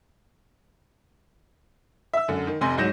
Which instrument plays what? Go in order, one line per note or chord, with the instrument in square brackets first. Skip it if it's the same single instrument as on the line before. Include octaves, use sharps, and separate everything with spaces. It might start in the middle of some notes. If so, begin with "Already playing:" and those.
[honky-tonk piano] E5 E6
F#2 D3
D#3
F1 C3 G#5 C6 A#6
C2 G#2 F#3 G6 A#6 E7